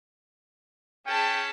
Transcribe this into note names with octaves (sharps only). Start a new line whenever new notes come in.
C#4 G#4 G5 A5 B6